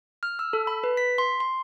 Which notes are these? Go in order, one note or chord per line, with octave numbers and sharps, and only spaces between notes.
F6
E6
A4
B5
B4
B6
C6
C6